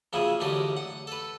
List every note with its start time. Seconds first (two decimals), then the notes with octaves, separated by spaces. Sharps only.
0.13 A#1 F#2 C#3 G#3 E4
0.40 A1 F#2 D3 D#4 G4
0.77 F#5
1.07 A4 B4